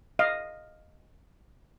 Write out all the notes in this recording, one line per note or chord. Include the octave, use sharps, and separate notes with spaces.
D#5 F5